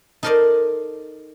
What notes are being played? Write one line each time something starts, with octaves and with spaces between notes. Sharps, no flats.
D#4 A4 A#4 C5 D5 D#5